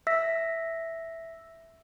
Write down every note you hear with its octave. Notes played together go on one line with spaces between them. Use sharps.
E5 E6 A#6 B6